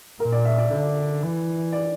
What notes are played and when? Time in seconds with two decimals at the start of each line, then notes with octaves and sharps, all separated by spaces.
0.20 A#2 A#4
0.32 D5
0.45 E5
0.58 D5
0.71 D3
1.22 E3
1.73 D5